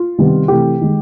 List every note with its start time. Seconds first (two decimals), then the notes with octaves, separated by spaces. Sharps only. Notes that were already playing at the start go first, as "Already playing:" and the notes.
Already playing: F4
0.18 C3 D#3 G3 B3
0.48 C3 E3 A3 G4
0.81 D#3 G#3